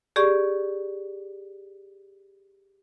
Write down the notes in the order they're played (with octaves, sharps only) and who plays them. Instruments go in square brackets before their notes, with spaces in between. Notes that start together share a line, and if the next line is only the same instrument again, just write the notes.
[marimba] G4 G#4 D5 C#6